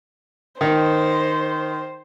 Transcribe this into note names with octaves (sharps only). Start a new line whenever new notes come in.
D#3 D#4 C5